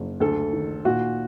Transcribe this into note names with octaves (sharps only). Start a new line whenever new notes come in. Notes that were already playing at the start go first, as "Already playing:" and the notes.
Already playing: F#1
D2 A4
D#3
A#2 F#4